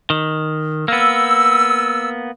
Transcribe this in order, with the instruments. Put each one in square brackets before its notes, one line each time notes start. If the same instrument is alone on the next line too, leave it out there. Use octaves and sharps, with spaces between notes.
[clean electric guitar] D#3
[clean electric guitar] A#3 B3 [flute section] E6